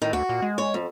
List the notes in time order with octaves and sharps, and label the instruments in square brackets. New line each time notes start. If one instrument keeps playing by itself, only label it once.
[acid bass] A2 [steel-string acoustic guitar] D#3
[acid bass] D2 [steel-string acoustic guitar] F#4
[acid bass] A#2
G#3
[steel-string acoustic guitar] C#5
F2